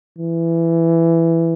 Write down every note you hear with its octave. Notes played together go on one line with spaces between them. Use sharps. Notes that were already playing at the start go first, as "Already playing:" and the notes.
E3